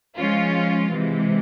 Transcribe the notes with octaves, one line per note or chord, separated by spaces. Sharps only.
F3 G#3 C#4 F4
C3 E3 G#3